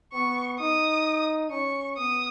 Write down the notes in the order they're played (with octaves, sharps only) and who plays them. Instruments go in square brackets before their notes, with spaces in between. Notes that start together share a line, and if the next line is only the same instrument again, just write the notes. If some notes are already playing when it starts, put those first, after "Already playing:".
[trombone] B3 [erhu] C#6
[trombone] D#4 [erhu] D#6
[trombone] C#4 [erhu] C#6
[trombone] B3 [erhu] D#6